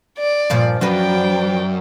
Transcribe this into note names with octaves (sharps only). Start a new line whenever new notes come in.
D5
G2 A#2 F3
F#2 F3 F#4 B4 D5 G5